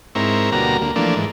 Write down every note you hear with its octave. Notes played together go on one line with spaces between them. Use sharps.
G#2 C4 E4 A#4 C#5
D2 B2 G3 A#3 F#4 A#5
D2 A#3
E3 F3 A3 A#3 D4
G#2 E3